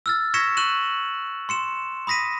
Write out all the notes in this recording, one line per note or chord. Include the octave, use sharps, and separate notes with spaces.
E6 F6 A6
C#6 G#6 A#6 B6 C#7 E7
C#6 F#6 D#7 E7 F#7
C6 C#7 E7
B5 D#6 A#6 B6 D#7